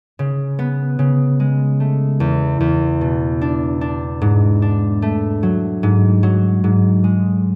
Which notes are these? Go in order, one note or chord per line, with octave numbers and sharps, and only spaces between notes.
C#3
B3
C#3
G#3
A3
E2
E2
B2
D4
D4
G#2
D4
A3
F#3
G#2
F#3
G#2
G#3